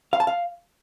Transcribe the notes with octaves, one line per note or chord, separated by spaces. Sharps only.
F5
A5
F5